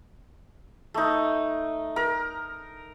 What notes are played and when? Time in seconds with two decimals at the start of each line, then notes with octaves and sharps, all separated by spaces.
0.94 A3 D#4
1.96 A#4